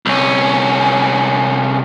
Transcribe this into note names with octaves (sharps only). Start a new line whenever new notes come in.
C2 C#4